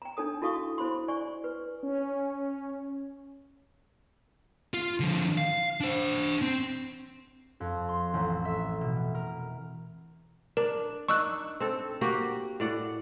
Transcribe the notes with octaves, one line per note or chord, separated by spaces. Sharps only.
G5 A#5
D4 D#4 A4 D#6
E4 F#4 A4 F5 C#6 D#6
E4 C5 B5 C6
D5 G#5 C#6
B4
C#4
F4
D3 F3
F5
D4 C5
C4
F2
C6
A1
E5
B2
A#4
D4 A#4
D4 D#4 C#6 E6 F#6
C4 A4
A#3 F#4 G4
A2 D5 F#5